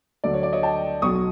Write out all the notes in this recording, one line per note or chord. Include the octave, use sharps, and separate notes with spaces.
D2 D3 F#3 D5
C#5
D5
C#5 D#5
G5 A5
B1 B2 F#3 C#6 D#6